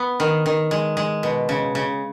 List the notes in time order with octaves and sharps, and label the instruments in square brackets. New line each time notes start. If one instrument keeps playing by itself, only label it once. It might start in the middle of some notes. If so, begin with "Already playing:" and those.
Already playing: [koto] B3
D#3
D#3
G#3
G#3
B2
C#3
C#3